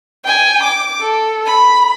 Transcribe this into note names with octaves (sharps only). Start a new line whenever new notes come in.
G5 G#5
D6
A4
B5